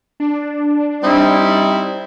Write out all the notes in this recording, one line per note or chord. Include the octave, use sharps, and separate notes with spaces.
D4
G3 C4 D#4 E4